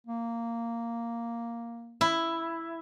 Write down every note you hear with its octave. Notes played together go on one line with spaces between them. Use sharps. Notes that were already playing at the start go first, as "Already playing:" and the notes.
A#3
E4